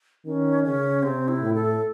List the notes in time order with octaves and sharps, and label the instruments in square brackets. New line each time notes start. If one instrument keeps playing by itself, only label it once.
[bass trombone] D#3 [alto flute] C#4
[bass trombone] C#3 [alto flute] C#4
[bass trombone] C3 [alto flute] C4
[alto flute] E4
[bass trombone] A2
[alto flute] A4